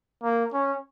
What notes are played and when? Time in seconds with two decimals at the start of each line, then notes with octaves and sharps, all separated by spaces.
0.23 A#3
0.53 C#4